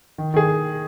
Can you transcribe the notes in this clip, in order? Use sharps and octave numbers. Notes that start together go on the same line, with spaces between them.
D#3
D#3 G#4